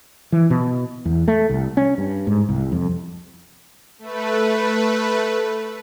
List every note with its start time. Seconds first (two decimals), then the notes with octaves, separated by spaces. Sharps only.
0.32 E3
0.50 B2
1.05 E2
1.28 A3
1.49 C2
1.77 C#4
1.98 G2
2.27 G#2
2.49 C2
2.72 F2
3.99 A3 B4